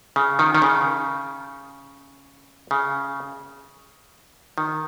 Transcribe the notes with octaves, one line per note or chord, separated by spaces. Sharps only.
C#3
D#3
D#3
C#3
C#3
D#3